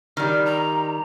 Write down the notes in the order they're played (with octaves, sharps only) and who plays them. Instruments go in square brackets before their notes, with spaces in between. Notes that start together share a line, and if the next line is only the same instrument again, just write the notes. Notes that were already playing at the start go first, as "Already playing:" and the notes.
[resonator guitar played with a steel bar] D#3 G3 [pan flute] F6
[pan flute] A#5